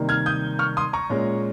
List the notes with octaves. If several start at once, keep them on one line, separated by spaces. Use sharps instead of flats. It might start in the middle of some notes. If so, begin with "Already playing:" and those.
Already playing: C3 D#3 G3 A#3 D#4
F6 G#6
D#6 G6
C#6 F6
C6 D#6
A#5 C#6
A#2 G#3 C#4